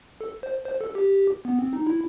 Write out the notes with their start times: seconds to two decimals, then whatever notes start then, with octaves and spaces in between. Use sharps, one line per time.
0.21 A4
0.43 C5
0.65 C5
0.81 A4
0.95 G4
1.45 B3
1.59 C4
1.73 D#4
1.87 E4